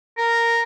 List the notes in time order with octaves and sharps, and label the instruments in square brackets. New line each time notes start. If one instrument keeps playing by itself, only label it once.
[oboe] A#4